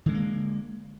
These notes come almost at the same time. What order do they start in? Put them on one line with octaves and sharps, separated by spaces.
D#3 G#3 D3 A#3